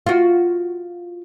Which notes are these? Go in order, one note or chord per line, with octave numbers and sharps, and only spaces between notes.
F4 F#4